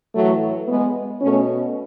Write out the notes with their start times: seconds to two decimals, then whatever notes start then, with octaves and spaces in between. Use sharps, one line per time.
0.15 A2 E3 F#3 A3
0.68 G#3 B3
1.21 B2 A3 C#4